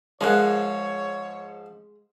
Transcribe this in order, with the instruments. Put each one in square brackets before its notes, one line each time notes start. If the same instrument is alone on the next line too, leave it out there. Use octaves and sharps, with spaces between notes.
[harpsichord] G#2 F3 [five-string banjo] G#3 [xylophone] G#4 A#4 F#6 [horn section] C#5